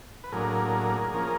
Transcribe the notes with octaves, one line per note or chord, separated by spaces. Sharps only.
B4
A2 F#3 A#3 D4 G#4 A#4
F3 A#3 C#4